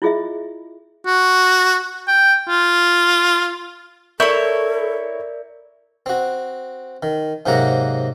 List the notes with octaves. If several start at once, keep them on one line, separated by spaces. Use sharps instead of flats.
E4 F4 G#4 D#5 E5
F#4
G5
F4
E4 A4 A#4 C#5 D5 E5 C#6 G6
C4 F#4
D#3
G#2 C3 F#3 A#3 F#5 A#5